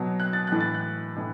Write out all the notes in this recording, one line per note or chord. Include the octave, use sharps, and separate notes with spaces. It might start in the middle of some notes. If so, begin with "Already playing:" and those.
Already playing: B2 F#3
F#6
A6
A2 E3 F#6
A6
F#6
A2 E3